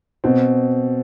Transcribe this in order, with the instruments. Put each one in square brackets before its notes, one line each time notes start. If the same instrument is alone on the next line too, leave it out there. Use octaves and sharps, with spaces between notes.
[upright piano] B2 [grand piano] C4